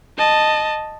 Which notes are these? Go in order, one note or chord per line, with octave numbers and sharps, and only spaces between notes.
D#5 A5